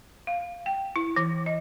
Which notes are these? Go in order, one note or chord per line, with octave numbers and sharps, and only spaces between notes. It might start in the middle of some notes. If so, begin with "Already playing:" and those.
F5
G5
E4
E3
D#5